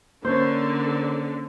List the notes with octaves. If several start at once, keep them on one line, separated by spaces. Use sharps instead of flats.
D3 A#3 C#4 A#4 C5 C#5